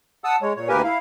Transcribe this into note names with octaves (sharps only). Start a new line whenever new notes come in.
F#5 A5 D#6 E6
G#3 C#5
A#2 C#5
D2 A#3 G4 A#4 B4 G#5
E4 F5